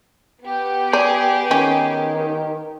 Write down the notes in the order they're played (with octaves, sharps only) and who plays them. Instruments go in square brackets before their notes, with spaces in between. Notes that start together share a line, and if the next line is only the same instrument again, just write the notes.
[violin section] B3 G4
[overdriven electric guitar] G#4 [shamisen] D5
[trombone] D#3 [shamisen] C#4